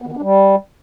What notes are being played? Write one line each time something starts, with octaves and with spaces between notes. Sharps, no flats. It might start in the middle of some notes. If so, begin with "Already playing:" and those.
B3
D#3
B3
D4
G3